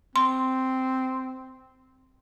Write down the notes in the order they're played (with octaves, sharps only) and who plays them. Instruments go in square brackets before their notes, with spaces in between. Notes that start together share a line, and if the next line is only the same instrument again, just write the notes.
[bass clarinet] C4 [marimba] C6